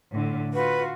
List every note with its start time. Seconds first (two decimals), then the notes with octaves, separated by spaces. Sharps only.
0.11 A2 D3
0.54 F4 F#4 B4